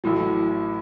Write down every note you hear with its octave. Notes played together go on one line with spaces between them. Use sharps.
A1 A2 F#3